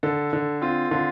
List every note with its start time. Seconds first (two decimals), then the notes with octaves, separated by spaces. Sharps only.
0.03 D3 A4
0.33 D3
0.61 C4 F4
0.91 D3 F4